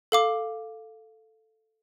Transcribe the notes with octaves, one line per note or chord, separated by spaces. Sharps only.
A4 F5 D6